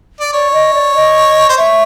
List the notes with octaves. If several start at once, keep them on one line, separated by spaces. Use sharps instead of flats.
D5
C#5 D5
D#5
D5
D#5
C5
C#5 E5